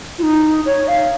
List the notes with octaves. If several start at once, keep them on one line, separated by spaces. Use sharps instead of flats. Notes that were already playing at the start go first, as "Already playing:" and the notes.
F4
D#4
C#5
F5